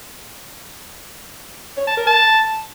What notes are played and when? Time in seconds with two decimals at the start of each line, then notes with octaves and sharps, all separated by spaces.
1.77 C#5
1.87 A5
1.97 A#4
2.07 A5